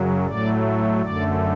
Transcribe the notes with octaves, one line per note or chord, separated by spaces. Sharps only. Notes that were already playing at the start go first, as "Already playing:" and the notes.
Already playing: F#2 C#3 F#3
A2 F#3 A3 D5
F#2 D3 A3 D5